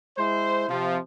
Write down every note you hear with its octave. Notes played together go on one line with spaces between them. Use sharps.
G#3 E4 C5
C3 F3